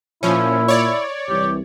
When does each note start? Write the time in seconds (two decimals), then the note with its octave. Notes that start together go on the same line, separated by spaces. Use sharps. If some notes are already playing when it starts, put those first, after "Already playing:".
0.23 A#2 F3 C#4 E4
0.68 C#5 D5
1.29 C2 E3 G4